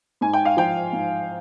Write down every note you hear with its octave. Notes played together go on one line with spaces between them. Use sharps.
G#2 G#5
G5
F5
F3 G5
G#2